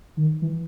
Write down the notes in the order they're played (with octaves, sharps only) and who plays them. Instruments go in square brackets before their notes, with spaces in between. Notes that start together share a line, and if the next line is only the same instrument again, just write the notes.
[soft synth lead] D#3
E3